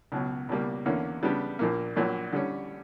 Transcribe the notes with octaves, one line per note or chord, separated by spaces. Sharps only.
C#2 B2 F#3
C#2 B2 G3 A#3
E2 D3 A#3 C#4
C#3 G3 B3 D4 G4
A#1 A#2 A#3
A#1 A#2 F#3
D3 G3 C#4